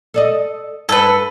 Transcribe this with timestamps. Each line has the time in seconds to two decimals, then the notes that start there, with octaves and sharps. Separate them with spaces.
0.14 A4 D5 D#5
0.89 G2 A4 B4